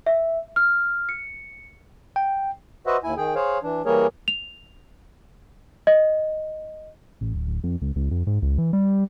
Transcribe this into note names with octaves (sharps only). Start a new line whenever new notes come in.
E5
F6
C#7
G5
F#4 B4 C5 D#5 E5 F#5
D#2 E4 G#5
D#3 G#4 G5
G#4 C5 C#5 F5
E3 D4
E3 G3 A#3 G#4 A#4 C#5
F7
D#5
A1
D1
D1
F2
C#2
C#2
F2
G#2
C#2
E3
G3